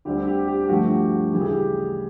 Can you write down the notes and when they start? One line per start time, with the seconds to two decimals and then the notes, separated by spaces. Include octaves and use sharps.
0.05 D2 D3 G3 C4 G4
0.27 G4
0.48 G4
0.64 G4
0.69 G2 D3 F3 A3 F#4
0.90 G4
1.12 F#4
1.33 D2 C#3 E3 G3 G4
1.41 G#4
1.49 G4